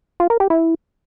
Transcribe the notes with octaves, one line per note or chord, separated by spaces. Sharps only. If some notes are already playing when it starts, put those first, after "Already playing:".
F4
A#4
G4
E4